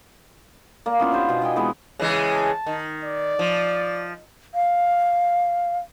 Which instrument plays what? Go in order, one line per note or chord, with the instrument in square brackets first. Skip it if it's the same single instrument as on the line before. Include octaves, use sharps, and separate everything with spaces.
[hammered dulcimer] A#3 D5
B3 C#4 E4 F4
D4 G4 C5
B2 B3
D#5 G5 G#5
E3 G#3 B3 C4
[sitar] C#3 E3 G#3
[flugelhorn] A5
[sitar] D#3
[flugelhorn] D5
[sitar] F3
[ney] F5